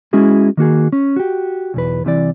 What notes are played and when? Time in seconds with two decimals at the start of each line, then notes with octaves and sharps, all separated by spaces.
0.13 G#3 C#4 E4 F#4 G#4
0.57 D#3 A#3 F#4 G#4
0.93 C#4
1.16 F#4 G4
1.74 B1 E2 B4
2.05 C2 C3 E3 D5